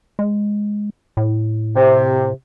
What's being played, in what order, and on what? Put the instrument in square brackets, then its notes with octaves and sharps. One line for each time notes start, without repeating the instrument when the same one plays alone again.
[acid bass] G#3
A2
[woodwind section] C3